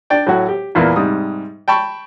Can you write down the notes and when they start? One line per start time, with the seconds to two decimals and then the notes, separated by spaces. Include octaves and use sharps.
0.10 D4 D5 G5
0.26 A2 F#3 F#4
0.49 G4
0.75 E2 A#2 E3 A#3 B3
0.96 G#2 C3 G3 D#6
1.68 G5 A5 B5 C#6